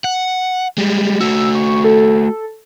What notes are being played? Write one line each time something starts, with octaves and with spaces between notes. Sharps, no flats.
F#5
G3 G#3
A3 F#4 E6
C#6
A4